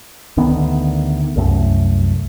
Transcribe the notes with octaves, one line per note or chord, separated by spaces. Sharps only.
D2 D3 D#3 B3
C2 F#2 A3